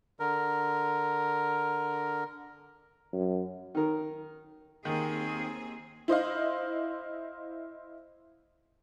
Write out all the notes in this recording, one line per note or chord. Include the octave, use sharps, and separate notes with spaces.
D3 A#4
F#2
D#3 A#4
D#2 D#3 C4 G#4
E4 C5 D#5 F5